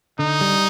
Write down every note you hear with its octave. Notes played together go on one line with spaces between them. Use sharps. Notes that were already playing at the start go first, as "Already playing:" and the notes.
D3 D#4
G3